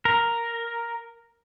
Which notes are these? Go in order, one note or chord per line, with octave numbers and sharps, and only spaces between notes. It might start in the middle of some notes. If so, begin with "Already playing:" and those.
A#4